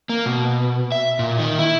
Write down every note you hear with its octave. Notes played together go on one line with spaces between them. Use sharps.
A#3
B2
E5
A#2
D#3
E4